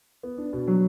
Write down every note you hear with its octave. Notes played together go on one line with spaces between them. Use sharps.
B3
D4
B2
F#3